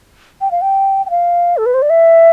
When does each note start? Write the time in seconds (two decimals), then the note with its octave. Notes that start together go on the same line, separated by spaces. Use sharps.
0.41 G5
0.51 F5
0.62 G5
1.06 G5
1.10 F5
1.57 A4
1.66 B4
1.74 C5
1.82 D5
1.90 E5